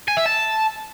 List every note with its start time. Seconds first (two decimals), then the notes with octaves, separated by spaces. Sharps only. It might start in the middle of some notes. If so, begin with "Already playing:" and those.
0.08 G#5
0.17 E5
0.26 A5